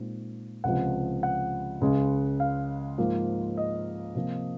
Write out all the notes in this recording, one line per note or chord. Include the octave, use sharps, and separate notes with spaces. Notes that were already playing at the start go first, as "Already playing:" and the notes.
Already playing: A#2 G#3 C4 D#4
C#2 C3 F3 F#5
F#5
C#2 C#3 G#3
F5
G#2 F3 A#3 F4
D#5
C3 F3 A#3 F4